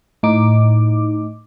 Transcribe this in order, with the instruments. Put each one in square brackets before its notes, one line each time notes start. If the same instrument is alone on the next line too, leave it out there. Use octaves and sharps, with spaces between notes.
[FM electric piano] A2 D#4 D6